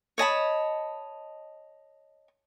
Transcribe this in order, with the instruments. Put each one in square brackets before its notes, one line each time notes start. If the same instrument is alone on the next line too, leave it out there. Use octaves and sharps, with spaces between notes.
[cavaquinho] C#5 D#5 A5 B5